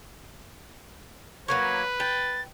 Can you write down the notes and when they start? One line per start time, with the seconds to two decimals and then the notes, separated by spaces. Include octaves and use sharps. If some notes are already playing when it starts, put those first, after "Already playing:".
1.48 F#3 A#3 C#4 B4 G#6
2.00 G5 A6